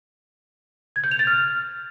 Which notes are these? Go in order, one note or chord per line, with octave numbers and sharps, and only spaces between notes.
G#6
G6
F7
A6
F6